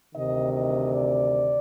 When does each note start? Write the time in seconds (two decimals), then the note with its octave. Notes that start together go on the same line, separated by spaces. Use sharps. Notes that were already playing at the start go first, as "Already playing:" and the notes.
0.14 D2 C3 D#3 D#5
0.54 D#5
0.92 D5